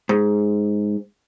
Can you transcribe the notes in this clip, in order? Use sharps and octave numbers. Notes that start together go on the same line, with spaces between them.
G#2